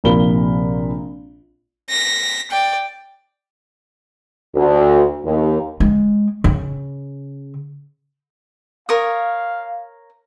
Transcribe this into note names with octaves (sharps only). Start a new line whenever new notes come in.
A#1 C3 F4 A#4 B5 G7
A#6 B6
D5 G5
D2
D#2
G#3
C#3
A#4 C#5 F5 D#6